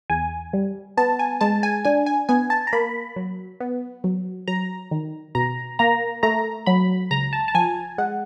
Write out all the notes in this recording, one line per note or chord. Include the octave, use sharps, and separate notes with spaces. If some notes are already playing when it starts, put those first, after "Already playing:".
E2 G#5
G3
B3 A5
G#5
G#3 A5
G#5
D4 G#5
G#5
B3 G#5
A5
A#5
A#3 B5
F#3
B3
F#3
F#3 A#5
D#3
B2 A#5
A#3 A#5
A3 A#5
F#3 B5
C#2 A#5
A5
A5
F3 G#5
G#3 F#5